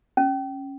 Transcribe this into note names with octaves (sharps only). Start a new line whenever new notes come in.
C#4